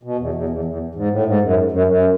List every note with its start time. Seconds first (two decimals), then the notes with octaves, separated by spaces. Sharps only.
0.03 B2
0.19 E2
0.34 E2
0.49 E2
0.65 E2
0.95 G#2
1.10 A2
1.26 G#2
1.41 F#2
1.72 F#2
1.87 F#2